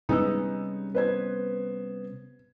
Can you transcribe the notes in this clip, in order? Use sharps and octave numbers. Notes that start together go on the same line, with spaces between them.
C3 G3 G#3 B3 C#4 D#4 D#6 E6
B3 B4 C5 G#6